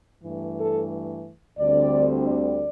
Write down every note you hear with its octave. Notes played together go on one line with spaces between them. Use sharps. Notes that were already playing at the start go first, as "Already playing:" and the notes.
G2 E3 A3
A4
D2 D3 G3 C4 D5
D5